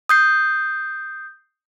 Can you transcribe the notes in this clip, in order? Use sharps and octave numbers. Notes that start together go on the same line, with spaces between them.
D#6 G6 C7